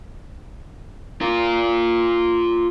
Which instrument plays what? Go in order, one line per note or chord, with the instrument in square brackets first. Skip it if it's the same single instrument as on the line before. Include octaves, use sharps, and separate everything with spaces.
[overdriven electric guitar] F4 A#4